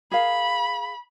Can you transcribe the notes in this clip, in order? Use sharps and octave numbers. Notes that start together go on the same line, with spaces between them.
G#4 A#4 F5 B5